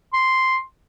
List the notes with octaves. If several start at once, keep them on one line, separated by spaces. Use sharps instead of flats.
C6